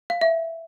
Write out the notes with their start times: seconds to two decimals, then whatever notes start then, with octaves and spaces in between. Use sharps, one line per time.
0.10 F5
0.21 E5